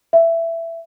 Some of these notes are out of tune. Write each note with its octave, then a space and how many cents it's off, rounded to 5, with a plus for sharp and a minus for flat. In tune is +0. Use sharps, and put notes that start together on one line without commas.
E5 +15